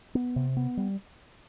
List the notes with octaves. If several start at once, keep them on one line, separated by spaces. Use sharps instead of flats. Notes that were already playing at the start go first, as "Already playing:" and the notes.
B3
C3
B3
G3